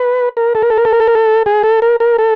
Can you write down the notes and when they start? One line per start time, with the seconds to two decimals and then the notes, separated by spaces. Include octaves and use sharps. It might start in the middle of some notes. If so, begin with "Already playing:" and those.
Already playing: B4
0.37 A#4
0.55 A4
0.62 A#4
0.70 A4
0.78 A#4
0.85 A4
0.92 A#4
1.00 A4
1.07 A#4
1.15 A4
1.46 G#4
1.63 A4
1.82 A#4
2.00 A#4
2.18 A4